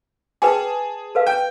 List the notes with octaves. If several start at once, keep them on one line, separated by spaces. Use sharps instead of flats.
G#4 B4 G5 A5 D6
A4 B4 F5
G5